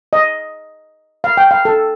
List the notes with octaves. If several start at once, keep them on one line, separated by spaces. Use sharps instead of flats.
D#5
F5
G5
F5
A4